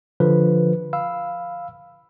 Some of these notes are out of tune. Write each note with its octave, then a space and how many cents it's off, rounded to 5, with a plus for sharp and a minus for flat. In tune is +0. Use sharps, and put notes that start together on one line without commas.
D3 +0 F3 +0 B4 -10
F5 +0 B5 +5 E6 +0